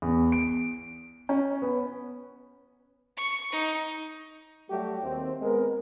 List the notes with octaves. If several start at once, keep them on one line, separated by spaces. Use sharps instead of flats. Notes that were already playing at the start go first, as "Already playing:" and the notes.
E2
D7
C#4
B3
C#6
D#4
F#3 G3 A3 F#4 G4
D#2 C4
G#3 B3 C4 A#4